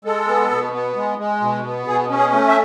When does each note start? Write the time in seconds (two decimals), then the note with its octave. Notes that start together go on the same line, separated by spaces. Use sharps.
0.05 G#3 A4
0.28 B3
0.50 B2
0.73 B3
0.96 G#3
1.18 G#3
1.41 B2
1.64 B3
1.87 B2 G#4
2.09 C#4
2.16 G#4
2.32 A3
2.48 E5